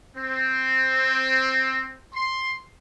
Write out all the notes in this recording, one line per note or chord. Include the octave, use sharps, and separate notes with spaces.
C4
C6